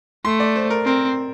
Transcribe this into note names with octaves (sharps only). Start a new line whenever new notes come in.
A3 C6
D5
C5
A#4
C4 A#4